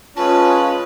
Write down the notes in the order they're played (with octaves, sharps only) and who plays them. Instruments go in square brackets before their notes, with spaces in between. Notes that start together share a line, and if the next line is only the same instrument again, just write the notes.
[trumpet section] G#3 C#4 [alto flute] F4 [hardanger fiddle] B4 [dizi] A5